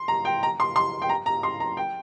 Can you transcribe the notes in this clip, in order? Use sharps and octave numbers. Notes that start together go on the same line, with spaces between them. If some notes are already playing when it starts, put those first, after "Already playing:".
Already playing: C6
A#5
G5
A#5
C6
C6
G5
A#5
A#5
C6
A#5
G5